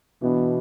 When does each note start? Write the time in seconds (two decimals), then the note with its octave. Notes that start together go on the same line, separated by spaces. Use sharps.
0.22 B2 E3 B3 D4